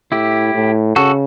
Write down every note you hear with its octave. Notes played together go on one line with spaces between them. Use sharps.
A2 E4 G4
A2
C#3 F#4 A4